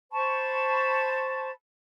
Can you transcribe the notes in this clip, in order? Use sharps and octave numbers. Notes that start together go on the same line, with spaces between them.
C5 A5 B5 C#6